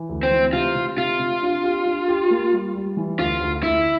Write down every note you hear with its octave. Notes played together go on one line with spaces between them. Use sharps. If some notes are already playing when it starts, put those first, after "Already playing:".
Already playing: E3
D2
C4
E3
C3 F4
C3
C3 F4
C3
D4
G4
D4
G4
A#3
G3
G3
E3
D2 F4
D2
D2 E4